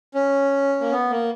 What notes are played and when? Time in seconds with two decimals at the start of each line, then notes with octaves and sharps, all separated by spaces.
0.15 C#4
0.81 A#3
0.91 B3
1.10 A#3